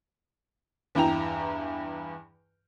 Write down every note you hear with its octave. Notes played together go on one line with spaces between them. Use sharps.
E2 G2 E4 G5 A#5 F7